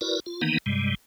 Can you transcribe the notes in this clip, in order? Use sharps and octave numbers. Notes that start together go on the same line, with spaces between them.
E4 F#4 A#4 B4 D5
F4
D#3 E3 A#3 B3 D#4
G2 C3 G3 G#3